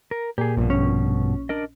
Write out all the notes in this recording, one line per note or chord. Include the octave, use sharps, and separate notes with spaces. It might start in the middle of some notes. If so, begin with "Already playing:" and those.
A#4
A#2 G4 G#4
A#1 G2 B2
C#4
D4 A#4 D#5